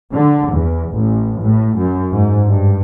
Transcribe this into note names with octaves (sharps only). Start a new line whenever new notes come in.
D3
E2
A1
A2
F#2
G#2
G2